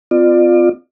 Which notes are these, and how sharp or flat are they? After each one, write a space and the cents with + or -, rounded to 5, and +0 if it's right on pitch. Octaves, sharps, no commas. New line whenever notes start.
C4 -40 F4 +0 D5 +30